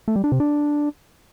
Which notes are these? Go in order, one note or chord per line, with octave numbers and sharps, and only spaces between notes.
A3
G3
D4
C3
D4